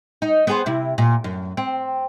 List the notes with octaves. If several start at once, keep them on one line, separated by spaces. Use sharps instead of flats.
D#4
B3 G#4 C5
C3 E4
A#2
F#2
C4